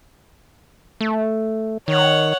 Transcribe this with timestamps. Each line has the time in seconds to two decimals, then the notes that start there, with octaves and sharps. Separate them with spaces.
1.01 A3
1.88 D#3 C#5 F#5